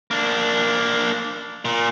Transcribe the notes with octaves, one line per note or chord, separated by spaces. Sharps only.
A#3 D4
A#2